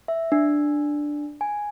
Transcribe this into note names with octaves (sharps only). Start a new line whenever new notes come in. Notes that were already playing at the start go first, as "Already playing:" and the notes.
E5
D4
G#5